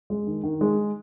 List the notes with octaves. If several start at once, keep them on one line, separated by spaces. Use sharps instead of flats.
G#3
D#3
D#3
G#3